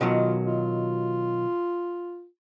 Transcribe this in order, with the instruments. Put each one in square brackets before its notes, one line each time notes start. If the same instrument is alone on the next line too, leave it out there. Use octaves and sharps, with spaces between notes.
[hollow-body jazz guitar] B2 D#3 F#3 [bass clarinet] F4
[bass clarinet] F4